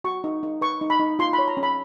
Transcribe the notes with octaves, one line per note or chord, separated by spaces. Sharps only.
F#4 C#6
D#4
D#4
B4 C#6
D#4
B5
D#4
F4 C6
B5
C#5
A#5
C#4
B5